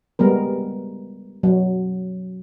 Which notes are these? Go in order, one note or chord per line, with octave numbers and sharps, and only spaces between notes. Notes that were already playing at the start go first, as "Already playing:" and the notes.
G3 G#3 B3 A#4
F#3